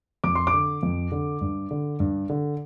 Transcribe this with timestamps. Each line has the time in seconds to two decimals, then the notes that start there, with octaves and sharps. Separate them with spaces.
0.24 F2 D6
0.35 C6
0.47 D6
0.53 D3
0.83 F2
1.12 D3
1.41 G2
1.71 D3
2.00 G2
2.30 D3